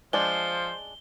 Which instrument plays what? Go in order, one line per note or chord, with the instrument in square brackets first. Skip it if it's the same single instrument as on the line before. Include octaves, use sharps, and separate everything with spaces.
[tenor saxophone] F3 [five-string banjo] G#3 D4 [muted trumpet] C5 [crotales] G7